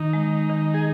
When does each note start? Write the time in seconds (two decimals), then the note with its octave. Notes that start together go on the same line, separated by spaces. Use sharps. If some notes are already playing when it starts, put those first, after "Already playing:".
Already playing: D#3 D#4
0.13 G#3
0.49 D#3
0.74 G#4